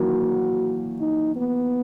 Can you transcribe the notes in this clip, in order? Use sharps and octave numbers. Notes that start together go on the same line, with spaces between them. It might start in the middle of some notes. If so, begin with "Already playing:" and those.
Already playing: D#3 E3 F#3 A#3 F#4
D#4
B3